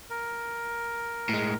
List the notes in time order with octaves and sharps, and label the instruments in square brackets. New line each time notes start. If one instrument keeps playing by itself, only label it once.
[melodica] A#4
[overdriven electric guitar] A2 G#3